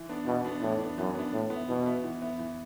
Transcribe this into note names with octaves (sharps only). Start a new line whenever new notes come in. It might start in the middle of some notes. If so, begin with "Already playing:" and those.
Already playing: E3
B3 D4
B2 E3
B3 D4
A2 E3
B3 D4
F#2 E3
B3 D4
A2 E3
B3 E4
B2 E3
B3 E4
E3
B3 E4
E3